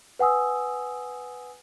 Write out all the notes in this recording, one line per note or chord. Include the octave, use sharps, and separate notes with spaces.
B4 F#5 G#5 D#6 E6